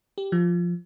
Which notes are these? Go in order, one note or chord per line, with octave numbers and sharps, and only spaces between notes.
G4
F3